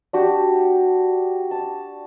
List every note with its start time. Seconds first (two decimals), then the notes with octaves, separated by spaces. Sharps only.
0.13 D4 F#4 G4
1.51 A5